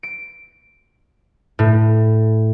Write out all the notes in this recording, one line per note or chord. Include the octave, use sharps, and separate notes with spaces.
D7
A2